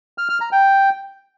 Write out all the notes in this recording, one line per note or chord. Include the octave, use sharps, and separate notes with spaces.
F6
F6
A#5
G5